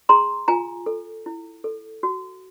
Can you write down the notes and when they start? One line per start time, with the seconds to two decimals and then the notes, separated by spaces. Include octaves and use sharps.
0.09 G#4 A#5 C6
0.48 F4 G#5 A#5
0.86 A4
1.26 E4
1.64 A4
2.03 F#4